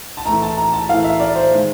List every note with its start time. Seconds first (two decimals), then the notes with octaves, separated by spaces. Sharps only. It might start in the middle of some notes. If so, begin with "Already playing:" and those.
0.17 A5
0.26 A2 E3 A3 A#5
0.42 A5
0.57 A#5
0.73 A5
0.89 A2 E3 A3 F5
1.04 E5
1.20 D5
1.35 C5
1.53 D#3 G#3